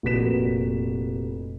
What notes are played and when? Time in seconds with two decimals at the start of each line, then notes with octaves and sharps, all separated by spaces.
0.03 F1 A#2 F#4 B4 B6 E7